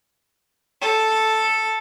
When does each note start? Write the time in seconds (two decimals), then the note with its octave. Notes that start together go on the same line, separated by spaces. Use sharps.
0.81 A4